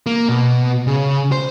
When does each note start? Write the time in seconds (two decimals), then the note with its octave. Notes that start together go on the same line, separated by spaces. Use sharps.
0.06 A#3
0.29 B2
0.87 C#3
1.32 C5